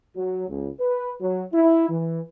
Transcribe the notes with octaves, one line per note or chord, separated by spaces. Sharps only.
F#3
C#2
B4
F#3
E4
E3